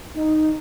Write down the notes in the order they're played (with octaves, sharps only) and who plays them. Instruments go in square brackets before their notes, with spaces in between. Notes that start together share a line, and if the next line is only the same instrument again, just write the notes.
[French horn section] D#4